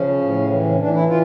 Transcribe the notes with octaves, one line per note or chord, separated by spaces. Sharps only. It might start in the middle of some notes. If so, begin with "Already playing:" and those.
Already playing: C#3 F3 C#4
A2
E3
C#4
E3 D4
E4
E3 F4